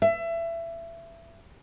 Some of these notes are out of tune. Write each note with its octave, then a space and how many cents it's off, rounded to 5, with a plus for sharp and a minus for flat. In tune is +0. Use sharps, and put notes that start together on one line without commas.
E5 +25